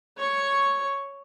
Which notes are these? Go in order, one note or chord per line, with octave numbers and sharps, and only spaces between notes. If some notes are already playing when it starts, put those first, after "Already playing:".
C#5 C#6